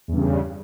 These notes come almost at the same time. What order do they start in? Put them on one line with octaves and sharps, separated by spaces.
E2 G2 C#3